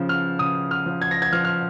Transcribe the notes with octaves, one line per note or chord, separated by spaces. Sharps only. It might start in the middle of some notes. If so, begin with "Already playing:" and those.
Already playing: C#3 F3
F6
C#3 D#6
F6
F3
G#6
A#6
G#6
F3 F6
F6